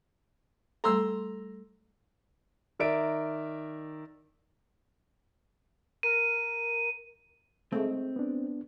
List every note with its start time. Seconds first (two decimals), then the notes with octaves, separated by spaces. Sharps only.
0.84 G3 A3 A4 A#5 C6 E6
2.79 D#3 A#4 D5 E5 D7
6.03 A#4 D#7
7.72 G#3 A3 C4
8.16 B3 D4